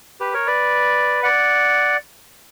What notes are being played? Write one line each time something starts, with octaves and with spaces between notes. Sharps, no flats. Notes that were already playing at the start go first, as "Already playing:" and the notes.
G4 B4
A#4 C#5
B4 D5
D5 F#5